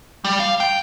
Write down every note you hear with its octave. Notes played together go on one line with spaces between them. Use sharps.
G3
F5
G5